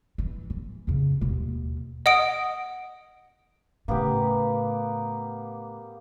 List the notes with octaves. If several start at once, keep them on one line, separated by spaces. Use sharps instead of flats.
E3
E3
F2 C#3
D#2 B2
D#5 F#5 D#6 D7
A2 C#3 A#3 B3 G4